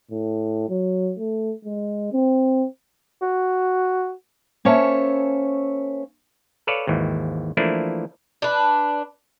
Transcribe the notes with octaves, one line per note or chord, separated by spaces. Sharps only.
A2
F#3
A3
G#3
C4
F#4
A#3 C#4 C5 C#5 E5 A5
A4 B4 C#5 D5 F5
G#1 D#2 E3
E3 F3 A3 A#3 D4 E4
D4 B4